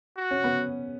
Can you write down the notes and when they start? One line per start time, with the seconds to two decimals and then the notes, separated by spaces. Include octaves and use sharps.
0.18 F#4
0.31 C#4
0.44 B3